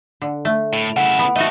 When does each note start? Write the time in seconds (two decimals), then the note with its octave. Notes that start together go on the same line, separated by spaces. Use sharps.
0.22 D3
0.45 A3
0.73 A2
0.97 C#3 E4 F#5
1.19 B3
1.36 A3 F#4 A4 D#5